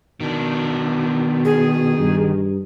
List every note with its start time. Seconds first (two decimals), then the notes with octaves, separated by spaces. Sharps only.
0.20 B2 D#3 D4
1.45 G#4
1.99 G2